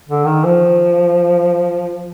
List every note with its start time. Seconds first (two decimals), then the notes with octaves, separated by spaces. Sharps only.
0.09 D3
0.26 D#3
0.45 F3